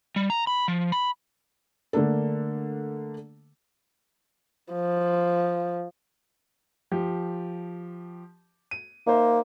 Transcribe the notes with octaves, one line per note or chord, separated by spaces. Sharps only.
G3
A#5
B5
F3
B5
D3 A3 A#3 D4 A4
F3
F3 G4
D#7
A#3 D#4 C5 E5